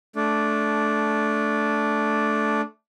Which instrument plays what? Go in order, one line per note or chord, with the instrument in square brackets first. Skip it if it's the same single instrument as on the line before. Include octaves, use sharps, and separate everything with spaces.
[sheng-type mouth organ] A3 D4